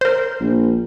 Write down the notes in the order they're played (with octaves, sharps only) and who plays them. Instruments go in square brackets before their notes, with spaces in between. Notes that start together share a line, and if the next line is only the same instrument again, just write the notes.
[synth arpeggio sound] A#4 C5
[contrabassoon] A#1